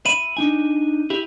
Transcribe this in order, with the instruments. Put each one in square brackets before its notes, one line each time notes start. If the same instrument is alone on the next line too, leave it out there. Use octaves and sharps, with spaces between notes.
[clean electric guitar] E5 B5 [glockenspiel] D#7
[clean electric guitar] D4 D#4 G#5
E4 G4